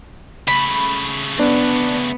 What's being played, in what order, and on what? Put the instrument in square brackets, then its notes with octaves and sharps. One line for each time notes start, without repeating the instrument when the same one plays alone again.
[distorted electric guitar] C#3 A3 [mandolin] B5
[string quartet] B3 [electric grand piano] D4